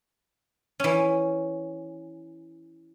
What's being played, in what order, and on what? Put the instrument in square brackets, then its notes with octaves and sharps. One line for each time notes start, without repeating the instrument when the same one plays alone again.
[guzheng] E3 C#4